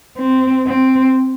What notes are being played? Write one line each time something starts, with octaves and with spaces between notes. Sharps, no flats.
C4
C4